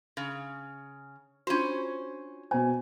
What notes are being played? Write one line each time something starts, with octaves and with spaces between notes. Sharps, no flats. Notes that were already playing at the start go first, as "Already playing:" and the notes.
C#3
C#4 D4 F4 F#4 C5
B2 C5 G#5